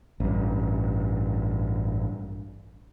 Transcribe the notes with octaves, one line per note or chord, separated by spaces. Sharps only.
A1 G2